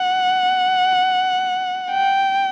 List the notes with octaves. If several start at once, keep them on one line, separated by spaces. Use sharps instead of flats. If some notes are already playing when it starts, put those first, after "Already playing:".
Already playing: F#5
G5